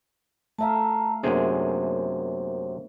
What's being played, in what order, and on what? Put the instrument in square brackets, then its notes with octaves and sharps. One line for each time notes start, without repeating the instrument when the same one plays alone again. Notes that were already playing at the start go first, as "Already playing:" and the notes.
[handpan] A3 E5 F5 [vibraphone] A5 A#5
[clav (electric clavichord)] F#2 C3 G#4 [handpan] A#3 B3 D4 [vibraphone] C5